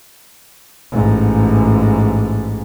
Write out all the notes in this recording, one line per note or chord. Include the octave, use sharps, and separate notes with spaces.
A1 G#2